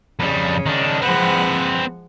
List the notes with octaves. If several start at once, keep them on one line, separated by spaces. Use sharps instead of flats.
F2 C#3 G3
D#3 D4
F3 G#3 C4 B4 F#5